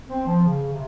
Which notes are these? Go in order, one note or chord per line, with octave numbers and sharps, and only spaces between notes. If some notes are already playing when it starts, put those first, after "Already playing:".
C4
F3
C#3
C3